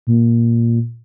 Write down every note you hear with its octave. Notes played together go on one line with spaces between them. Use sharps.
A#2